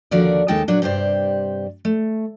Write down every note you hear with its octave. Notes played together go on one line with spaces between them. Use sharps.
D#2 D3 F3 F#4 A#4 D5
D#2 G#3 D#4 A4 G5 A5
A#2 F#3 D4 F#4
G2 C3 G4 C5 D5
A3